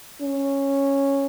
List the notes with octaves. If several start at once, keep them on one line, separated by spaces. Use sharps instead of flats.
C#4